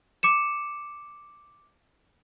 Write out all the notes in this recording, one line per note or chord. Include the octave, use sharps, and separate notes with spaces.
D6 C#7 E7